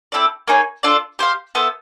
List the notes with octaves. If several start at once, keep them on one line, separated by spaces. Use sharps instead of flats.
C4 E4 A4 D5
A#3 D#4 G#4 C#5
D4 F4 A4 D5
G4 C5 F5
B3 E4 A4 C5